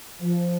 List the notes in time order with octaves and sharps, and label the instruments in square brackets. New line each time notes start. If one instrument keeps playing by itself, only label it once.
[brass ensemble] F3